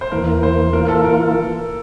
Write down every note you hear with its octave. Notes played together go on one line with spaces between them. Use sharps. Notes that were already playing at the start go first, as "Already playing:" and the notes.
C5
E2 E3 A#3 A#4
C5
E3 A#3 F4 A#4
A4
A#4